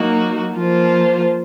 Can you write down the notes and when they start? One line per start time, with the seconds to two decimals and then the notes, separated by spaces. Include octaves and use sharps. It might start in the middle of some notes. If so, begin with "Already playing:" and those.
Already playing: F#3 A#3 D#4 F#4
0.54 F3 A#3 F4 C5